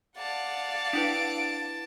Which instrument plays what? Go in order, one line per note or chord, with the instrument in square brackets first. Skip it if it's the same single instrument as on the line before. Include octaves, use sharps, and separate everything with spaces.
[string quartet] D5 F5 F#5 [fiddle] A5
[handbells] D4 E4 B4 [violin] D7